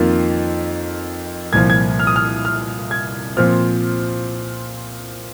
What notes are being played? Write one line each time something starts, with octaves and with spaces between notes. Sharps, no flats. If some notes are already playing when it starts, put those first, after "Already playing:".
Already playing: F2 D#3 A#3 F4
C2 A#2 F3 G#6
G#6
F6
D#6
F6
F6
G#6
A#2 F3 C4 F4 F6